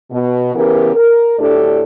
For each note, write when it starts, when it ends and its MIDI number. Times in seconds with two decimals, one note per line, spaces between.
0.11 0.53 47
0.55 0.92 49
0.55 0.92 52
0.55 0.92 59
0.55 0.92 67
0.55 0.92 70
0.96 1.35 70
1.39 1.84 38
1.39 1.84 45
1.39 1.84 62
1.39 1.84 67
1.39 1.84 69
1.39 1.84 74